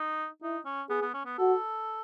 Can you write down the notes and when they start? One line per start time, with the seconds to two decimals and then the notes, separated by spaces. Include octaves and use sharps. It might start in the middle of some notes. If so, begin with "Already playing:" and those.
Already playing: D#4
0.42 D#4 E4
0.65 C#4
0.90 B3 G#4
1.01 B3
1.14 C#4
1.26 B3
1.38 F#4 A4